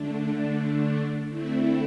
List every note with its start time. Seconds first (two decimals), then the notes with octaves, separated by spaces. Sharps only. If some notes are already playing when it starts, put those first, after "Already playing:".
Already playing: D3 A3 D4
1.28 D3 A3 C4 E4